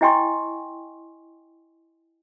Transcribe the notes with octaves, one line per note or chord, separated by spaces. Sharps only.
E4 D#5 G5 G#5 C6 C#6